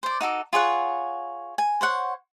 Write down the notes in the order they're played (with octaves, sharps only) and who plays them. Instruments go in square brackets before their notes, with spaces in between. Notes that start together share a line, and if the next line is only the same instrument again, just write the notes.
[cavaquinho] C5 D5
D#4 F#4 A4 D6
F4 G#4 C#5 F#5
G#5
C5 C#5 F#5